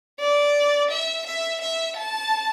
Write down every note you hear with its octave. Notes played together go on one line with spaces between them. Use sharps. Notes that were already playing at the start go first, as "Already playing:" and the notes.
D5
E5
E5
E5
A5